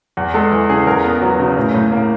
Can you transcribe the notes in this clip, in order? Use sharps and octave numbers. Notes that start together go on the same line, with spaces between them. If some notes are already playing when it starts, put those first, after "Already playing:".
E2
G#3 A4
E3
C#3 G#4
E2 A#4
B3
F#3
C#3
A2
A2
A#3